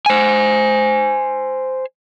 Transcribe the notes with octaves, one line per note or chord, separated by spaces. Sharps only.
C5 G#5